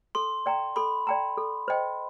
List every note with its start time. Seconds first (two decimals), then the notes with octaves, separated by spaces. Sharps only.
0.15 A4 C6
0.46 D5 G5 A#5
0.76 A4 B5
1.07 D5 G5 A#5
1.38 A4
1.68 C5 D#5 G5